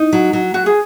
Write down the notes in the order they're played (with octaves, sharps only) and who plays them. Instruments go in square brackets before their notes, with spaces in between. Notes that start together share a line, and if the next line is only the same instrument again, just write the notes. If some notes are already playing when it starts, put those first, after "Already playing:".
Already playing: [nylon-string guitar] D#4
F#3
F#3
[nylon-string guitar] F#3 [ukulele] F#4
[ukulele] G#4